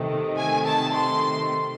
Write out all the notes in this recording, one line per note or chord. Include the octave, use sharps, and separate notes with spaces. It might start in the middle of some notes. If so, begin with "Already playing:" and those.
Already playing: C3 D#3 A3
G#5
A5
C6